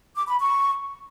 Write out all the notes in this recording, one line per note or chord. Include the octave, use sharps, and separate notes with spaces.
D6
B5
C#6